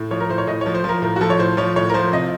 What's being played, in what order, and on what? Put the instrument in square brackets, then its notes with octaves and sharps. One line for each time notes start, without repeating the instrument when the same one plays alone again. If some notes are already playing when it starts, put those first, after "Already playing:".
Already playing: [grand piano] A2
F3 C#5
A#4
A2 C5
C#5
A2 D#5
C#5
F3
C5
F3 A#4
A2 A#4
F#4
F3 A4
C#5
A2 C5
F3 C#5
A2 C#5
A#4
F3 C5
C3 D#5